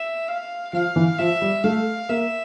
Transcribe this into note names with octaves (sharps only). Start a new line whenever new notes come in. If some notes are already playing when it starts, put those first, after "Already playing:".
Already playing: E5
F5
F3 F5
E3
F3 E5
G3
A3 F5
A#3 E5